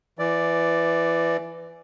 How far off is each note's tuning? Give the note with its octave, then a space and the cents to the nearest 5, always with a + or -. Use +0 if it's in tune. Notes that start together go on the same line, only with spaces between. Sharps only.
E3 +20 D5 +0